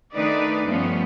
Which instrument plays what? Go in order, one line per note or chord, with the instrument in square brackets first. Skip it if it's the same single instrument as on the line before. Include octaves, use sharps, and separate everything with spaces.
[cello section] D#3 A3 D4 D#4 B4 D5
G2 F3 A3 B3 C#4